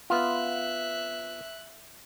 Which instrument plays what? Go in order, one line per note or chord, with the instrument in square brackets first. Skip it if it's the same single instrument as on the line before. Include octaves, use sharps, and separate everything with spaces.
[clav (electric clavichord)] B3 F4 [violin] E5 F#6